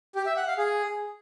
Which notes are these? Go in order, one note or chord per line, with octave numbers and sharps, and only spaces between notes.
G4
E5
F#5
F5
G#4